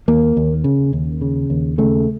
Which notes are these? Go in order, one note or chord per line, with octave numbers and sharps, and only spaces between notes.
D#2 A#3
D#2
C#3
D#2
C#3
D#2
C#3 A3